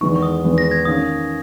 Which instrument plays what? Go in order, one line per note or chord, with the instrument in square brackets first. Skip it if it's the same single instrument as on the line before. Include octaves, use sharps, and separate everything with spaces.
[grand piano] E2 D#3 G#3 B3 D#4 [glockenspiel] C#6
[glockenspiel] C#6
D#6
[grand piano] E2 D#3 G#3 B3 D#4
[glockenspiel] A#6
G#6
[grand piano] D#3 A#3 C#4 [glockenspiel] D#6